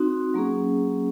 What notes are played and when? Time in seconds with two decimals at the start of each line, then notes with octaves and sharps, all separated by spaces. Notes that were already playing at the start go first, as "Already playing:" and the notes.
Already playing: C4 D#4 F#4
0.34 F#3 A#3 C#4 G#4